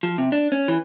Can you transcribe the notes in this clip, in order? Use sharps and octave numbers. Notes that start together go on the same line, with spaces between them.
F3
C3
D4
C#4
E3